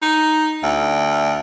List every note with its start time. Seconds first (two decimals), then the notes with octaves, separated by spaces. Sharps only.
0.02 D#4
0.63 D2